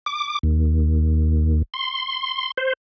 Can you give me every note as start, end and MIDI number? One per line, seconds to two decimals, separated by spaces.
0.06 0.39 86
0.43 1.62 39
1.74 2.51 84
2.57 2.73 72